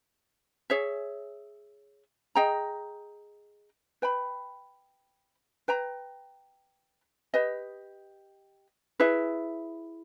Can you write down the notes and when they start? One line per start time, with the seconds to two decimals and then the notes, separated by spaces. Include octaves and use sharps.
0.70 G#4 C#5 E5
2.35 G#4 D#5 G5 A#5
4.02 B4 G5 B5
5.68 B4 G5 A#5
7.34 G4 B4 D#5
9.00 E4 G#4 B4 E5